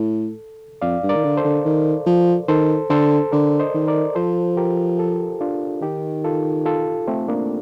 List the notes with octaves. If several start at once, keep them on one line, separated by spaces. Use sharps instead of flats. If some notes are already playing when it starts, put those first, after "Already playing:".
Already playing: A2 A4
F2 D5 F5
G2
A#4 D5
D#3
D3
A4 C5
D3
D#3
F3
D#3 A4 C5
D3 A4 C5
D3 A#4 D5
C5 D#5
D#3
A#4 D5
F3 A4 C5
G4 A#4
F4 A4
D4 F4
D#3 D#4 G4
F4 A4
F4 A4
A3 C4
A#3 D4